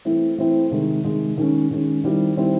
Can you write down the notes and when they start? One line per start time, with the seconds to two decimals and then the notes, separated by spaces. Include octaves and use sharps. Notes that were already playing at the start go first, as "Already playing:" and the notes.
0.05 E3 A3 C4 E4
0.38 E3 A3 C4 E4
0.71 C3 D#3 G#3
1.04 C3 D#3 G#3
1.38 D#3 G#3 C#4
1.71 D#3 G#3 C#4
2.04 D#3 G3 C4 E4
2.37 D#3 G3 C4 E4